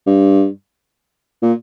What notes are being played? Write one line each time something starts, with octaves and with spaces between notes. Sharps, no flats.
G2
A#2